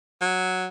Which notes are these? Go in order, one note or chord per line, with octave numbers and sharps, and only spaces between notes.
F#3